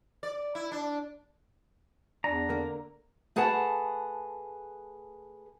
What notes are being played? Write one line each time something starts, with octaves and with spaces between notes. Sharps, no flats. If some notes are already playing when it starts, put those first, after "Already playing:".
D5
E4
D4
E2 D4 A#5
D3 A#3
A3 G#4 B4 F#5 A5